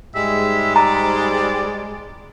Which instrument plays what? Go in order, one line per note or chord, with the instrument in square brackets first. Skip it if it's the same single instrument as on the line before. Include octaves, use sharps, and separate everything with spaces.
[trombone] G#2 [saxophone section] G3 G#3 [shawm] E5
[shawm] D5 [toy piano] A#5